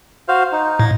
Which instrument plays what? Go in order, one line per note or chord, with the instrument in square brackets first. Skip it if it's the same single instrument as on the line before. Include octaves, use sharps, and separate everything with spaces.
[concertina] F#4 C5 F5
D#4
[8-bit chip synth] A2